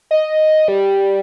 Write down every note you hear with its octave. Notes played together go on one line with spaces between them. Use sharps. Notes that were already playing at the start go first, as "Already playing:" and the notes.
D#5
G3